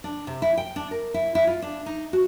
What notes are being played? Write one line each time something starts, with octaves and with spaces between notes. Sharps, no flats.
D4
C3
E4
G5
D4
A#4
E4
E4
F4
D4
D#4
F#4